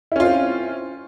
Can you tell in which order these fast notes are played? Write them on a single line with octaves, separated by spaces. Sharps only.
E4 C#4 F4 C4